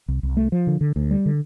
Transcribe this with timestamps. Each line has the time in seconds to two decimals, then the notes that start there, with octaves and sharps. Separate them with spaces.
0.08 C2
0.23 C2
0.37 A3
0.52 F3
0.67 D3
0.81 D3
0.96 D2
1.11 G3
1.26 D3